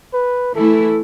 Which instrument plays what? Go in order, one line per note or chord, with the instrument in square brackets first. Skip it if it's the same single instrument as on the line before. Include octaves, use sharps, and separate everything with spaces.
[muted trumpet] B4
[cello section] E3 A3 E4 [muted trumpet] A4